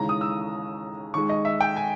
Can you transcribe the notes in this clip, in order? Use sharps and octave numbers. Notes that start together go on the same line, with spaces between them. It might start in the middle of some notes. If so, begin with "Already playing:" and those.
Already playing: D#2 C#3 E3 G#3 A#5
D#6
E6
D#2 D#3 G#3 C#6
D#5
E5
G5
G#5